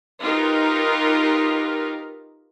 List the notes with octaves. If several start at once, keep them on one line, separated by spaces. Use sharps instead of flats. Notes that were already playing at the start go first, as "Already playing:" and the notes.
D#4 F4 G4 A#4 B4